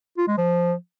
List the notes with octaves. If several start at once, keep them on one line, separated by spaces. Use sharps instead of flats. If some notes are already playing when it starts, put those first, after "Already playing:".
F4
G#3
F3